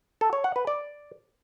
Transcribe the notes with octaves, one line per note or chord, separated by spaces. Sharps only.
A4
C#5
F#5
B4
D5